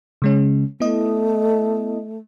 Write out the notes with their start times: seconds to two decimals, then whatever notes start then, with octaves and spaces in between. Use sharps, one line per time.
0.22 C#3 G#3 C#4
0.80 A3 B3 E4 D#5